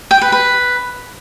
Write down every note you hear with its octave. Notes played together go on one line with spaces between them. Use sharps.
G5
B4
B4